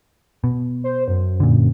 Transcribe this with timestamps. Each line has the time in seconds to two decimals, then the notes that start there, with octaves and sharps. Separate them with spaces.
0.44 B2
0.84 C5
1.08 F#2
1.40 A#2 D3